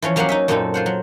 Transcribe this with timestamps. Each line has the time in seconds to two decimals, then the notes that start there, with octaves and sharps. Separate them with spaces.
0.02 E3 F3 C#4 C#5
0.16 F#3 A#3 C#4 G4 F5 F#5
0.29 D#4 D#5 E5
0.48 F#2 A#2 C4 C#4 D#4 A4
0.74 F4 C5 F#5
0.86 F#3